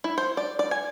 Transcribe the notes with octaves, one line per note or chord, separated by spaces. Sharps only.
E4
C5
D5
D5
G#5